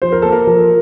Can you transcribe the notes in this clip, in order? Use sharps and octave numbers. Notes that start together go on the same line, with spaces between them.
F3 C5
A#4
A#3 A4
A#4
F3